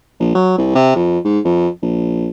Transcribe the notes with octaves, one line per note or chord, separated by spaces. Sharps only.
A#1
F#3
C2
C3
F2
G#2
F2
A#1